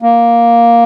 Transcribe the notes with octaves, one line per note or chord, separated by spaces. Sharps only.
A#3